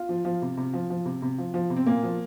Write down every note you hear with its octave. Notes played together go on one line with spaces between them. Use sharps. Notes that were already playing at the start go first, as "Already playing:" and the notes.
Already playing: F4
F3
F3
C3
C3
F3
F3
C3
C3
F3
F3
C3
C4
A#2 A#3
F3